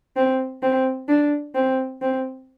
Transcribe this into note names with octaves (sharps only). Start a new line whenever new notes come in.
C4
C4
D4
C4
C4